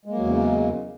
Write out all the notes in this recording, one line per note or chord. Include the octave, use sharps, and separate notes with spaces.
E2 C#3 F#3 G#3 A#3